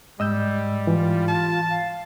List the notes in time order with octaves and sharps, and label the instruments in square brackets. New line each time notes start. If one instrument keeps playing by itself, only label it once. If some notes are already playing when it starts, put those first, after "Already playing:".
[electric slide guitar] G#2 [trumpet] G3 [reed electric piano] D#5 E6 G6
[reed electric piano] E3 [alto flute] F4
[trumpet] A5
[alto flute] F5